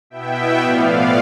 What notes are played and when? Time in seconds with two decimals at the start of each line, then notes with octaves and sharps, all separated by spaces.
0.10 B2 B3 E4 E5 G5
0.60 A2 F3 B3 D5 F5